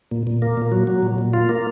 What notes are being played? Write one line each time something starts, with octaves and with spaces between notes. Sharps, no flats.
A#2
A#2
A#3
A#2
F#3
F#3
A#2
A#2
F4
A#3